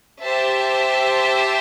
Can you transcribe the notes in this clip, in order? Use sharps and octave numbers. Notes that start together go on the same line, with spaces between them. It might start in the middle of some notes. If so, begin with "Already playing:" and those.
G4 C5 E5 A5